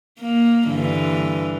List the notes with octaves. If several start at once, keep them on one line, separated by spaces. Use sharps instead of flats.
A#3
G2 D3 E3